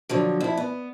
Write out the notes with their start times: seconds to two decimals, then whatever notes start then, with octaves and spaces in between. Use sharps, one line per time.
0.09 D3 F3 F#3
0.41 F2 E4
0.57 B3